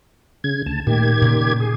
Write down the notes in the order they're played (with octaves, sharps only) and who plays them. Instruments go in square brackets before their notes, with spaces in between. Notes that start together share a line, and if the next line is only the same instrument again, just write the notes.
[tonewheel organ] C#3 G#6
D2 A5
[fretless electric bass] A#2 A3 [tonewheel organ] D#3 G4 G#6
[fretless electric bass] A#2 C#3
[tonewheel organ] G#4